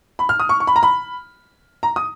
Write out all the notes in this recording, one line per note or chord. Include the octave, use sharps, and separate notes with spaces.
B5
F6
D#6
C#6
C#6
B5
A#5
B5
A#5
D#6